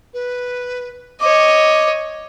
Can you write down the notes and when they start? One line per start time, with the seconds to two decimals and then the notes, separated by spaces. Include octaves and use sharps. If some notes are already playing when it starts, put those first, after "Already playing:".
0.14 B4
1.21 C#5 D#5 D6